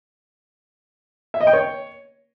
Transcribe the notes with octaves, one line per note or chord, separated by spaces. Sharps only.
E5
D#5
G5
C#5